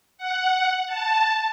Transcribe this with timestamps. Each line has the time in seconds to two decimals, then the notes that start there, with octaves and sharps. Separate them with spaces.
0.18 F#5
0.87 A5